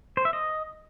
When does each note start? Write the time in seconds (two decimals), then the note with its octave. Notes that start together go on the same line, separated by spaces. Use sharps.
0.17 C5
0.25 E5
0.33 D#5